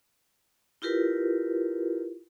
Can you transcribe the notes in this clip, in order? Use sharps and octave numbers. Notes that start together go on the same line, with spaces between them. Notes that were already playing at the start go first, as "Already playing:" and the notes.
E4 F4 G4 A#4 B4